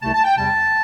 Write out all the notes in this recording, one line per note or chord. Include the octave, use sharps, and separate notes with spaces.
C2 C3 A3 A5
A5
G5
E2 C3 G3 A5